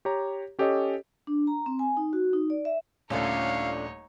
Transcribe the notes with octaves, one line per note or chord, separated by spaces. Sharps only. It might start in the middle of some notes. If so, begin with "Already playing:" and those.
G4 C#5 A#5
C#4 G4 A4 C#5 D#5
D4
A#5
C4
G#5
D#4
F#4
D#4
D5
E5
D#1 D3 F3 A3 C#4 D#4 C#5 F5